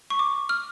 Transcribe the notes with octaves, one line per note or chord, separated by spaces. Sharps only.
C#6
D6
F6